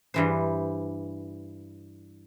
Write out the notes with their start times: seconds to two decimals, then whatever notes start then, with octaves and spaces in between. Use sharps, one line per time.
0.14 G2 E3 C5